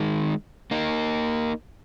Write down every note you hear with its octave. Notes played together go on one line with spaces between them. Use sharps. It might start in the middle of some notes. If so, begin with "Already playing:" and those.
Already playing: D#3 G#3
A#3 D#4